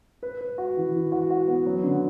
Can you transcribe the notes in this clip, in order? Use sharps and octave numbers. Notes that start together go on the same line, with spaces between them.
B4
B4
F#4
E3
E3
F#4
F#4
B3
F#3
D3